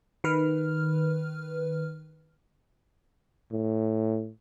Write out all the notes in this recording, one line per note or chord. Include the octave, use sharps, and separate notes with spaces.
D#3 B4 F6
A2